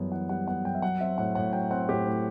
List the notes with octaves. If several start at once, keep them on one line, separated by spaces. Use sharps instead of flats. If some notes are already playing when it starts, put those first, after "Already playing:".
Already playing: F#2 E3 G3 B3
E3 F#5
G3 F#5
B3 F#5
F#2 G5
E5
F#3 F#5
C4 E5
A2 F#5
A2 F#5
F#3 G5
C4 F#5
A2 G4
A2